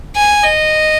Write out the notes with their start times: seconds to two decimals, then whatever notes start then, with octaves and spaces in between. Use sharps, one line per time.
0.16 G#5
0.44 D#5